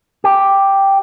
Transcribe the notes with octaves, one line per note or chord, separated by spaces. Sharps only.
G4